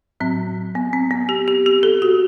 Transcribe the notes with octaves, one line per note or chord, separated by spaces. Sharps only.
A2 F#3 C4
B3
C4
B3
G4
G4
G4
A4
F#4